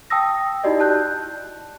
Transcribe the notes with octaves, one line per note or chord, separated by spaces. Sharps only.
G5 A5 D#6 E6 A#6
D#4 E4 F#4 G4 D5 D#5
A5 F#6 G6